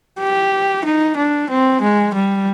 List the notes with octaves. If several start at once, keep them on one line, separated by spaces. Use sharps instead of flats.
G4
D#4
D4
C4
G#3
G3